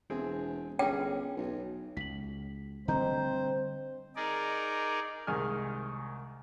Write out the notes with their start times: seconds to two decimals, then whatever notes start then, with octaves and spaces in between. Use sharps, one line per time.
0.10 E1 C4 G#4
0.79 G1 C#4 G#4 G5
1.37 B1
1.97 C#2 B6 F#7
2.88 D3 G3 A3 C4 C5 D#5 A#5 G6
4.16 D#4 G#4 A#4 D5
5.27 C2 D#3 G#3 G#5 F6